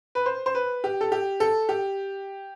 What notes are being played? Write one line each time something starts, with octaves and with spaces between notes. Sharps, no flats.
B4
C5
C5
B4
G4
A4
G4
A4
G4